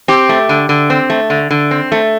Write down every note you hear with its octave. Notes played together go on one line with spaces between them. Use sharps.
C4 G4
A3
D3
D3
C4
A3
D3
D3
C4
A3